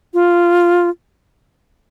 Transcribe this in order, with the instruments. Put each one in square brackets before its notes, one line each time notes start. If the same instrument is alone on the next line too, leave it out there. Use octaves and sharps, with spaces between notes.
[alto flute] F4